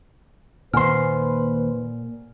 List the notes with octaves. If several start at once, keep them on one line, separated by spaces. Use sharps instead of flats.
D#2 A#2 B4 C5 F#5 G#5 F6